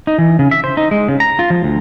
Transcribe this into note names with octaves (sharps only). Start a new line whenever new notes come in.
D#4
E3
C#3
E5
C5
D#4
G#3
C#3
A#5
F4
F3
D2